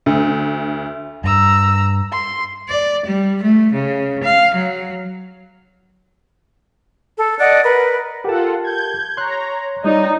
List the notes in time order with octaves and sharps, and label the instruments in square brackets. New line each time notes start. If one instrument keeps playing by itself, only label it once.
[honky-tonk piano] D2
[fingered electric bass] G2 [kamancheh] A#5 E6
[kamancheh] C6
[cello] D5
G3
A3
C#3
F5
F#3
[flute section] A4
D5 D#5 F#5 F#6
A#4 B4
[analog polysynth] F4 A4 F#5 [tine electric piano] G4 A#4 A5
[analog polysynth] G6 G#6
[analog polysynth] C#5 A#5 [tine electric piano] C6 F#6
[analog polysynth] G3 [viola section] D#4 [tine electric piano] C#5 D5